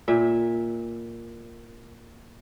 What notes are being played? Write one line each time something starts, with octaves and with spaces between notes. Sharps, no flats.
A#2 E5